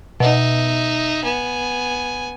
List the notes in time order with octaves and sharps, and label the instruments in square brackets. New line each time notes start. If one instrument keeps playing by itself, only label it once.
[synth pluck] B2 [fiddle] D#4 E5
[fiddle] B3 G#5